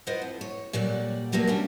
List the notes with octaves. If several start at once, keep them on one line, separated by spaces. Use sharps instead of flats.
E4 F4 C5 D#5 F#5
F2
C#5
A#2 F#3 G3 D5 F#5
D#3 F#3 G3 A3 A#3
A#3 C#4 D4 E4